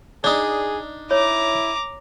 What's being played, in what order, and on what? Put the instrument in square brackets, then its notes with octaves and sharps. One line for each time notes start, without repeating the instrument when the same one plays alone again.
[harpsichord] D4 D#4 [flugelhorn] G#4 [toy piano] D5 D#6
[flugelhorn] E4 [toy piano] C#5 [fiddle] A#5 D6